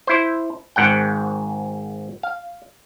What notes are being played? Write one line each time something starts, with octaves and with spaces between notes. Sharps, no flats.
E4 C5
G#1 G#2 F#5 G5
F5